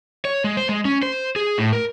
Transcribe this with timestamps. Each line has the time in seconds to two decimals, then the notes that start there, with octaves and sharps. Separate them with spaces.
0.25 C#5
0.44 G#3
0.57 C5
0.69 G#3
0.85 C#4
1.03 C5
1.36 G#4
1.58 A2
1.73 A#4